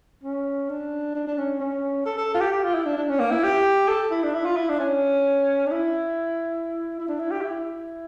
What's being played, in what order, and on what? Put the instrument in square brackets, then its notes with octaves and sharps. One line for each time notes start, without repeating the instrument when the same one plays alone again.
[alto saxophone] C#4
D4
D4
D4
C#4
C#4
A4
A4
F4
G4
G4
F4
E4
D4
D4
C#4
A#3
E4
G4
A4
E4
D4
E4
F4
E4
D4
C#4
D4
E4
E4
D4
E4
G4
E4